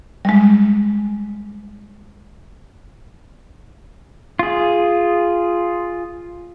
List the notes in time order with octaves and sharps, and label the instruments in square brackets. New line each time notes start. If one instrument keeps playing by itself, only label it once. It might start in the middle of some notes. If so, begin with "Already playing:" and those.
[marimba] G3 G#3
[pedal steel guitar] F4 G#4